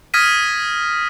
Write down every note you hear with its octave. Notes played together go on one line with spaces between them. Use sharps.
D#6 F6 G#6 A#6 B6 D#7